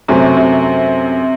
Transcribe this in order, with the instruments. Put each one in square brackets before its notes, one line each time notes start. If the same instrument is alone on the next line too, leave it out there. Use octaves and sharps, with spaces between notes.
[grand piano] F#2 F#3 A3 [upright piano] C3
[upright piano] C3